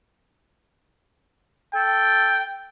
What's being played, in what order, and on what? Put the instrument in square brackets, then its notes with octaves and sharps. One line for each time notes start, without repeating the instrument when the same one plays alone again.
[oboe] A4 [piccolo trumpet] G5